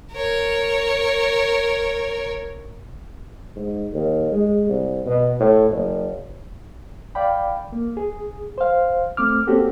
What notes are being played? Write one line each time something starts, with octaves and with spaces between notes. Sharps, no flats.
A#4 C#5
G#2
D#2
G#3
C2
B2
A2
F#1
D5 F5 G5 B5
A#3
G#4
C5 F5
A3 C4 D6 F6
A#3 C4 C#4 F#4 G4 A4